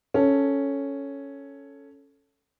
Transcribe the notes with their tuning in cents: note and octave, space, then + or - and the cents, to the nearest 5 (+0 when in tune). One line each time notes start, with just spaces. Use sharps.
C#4 +0 A4 +0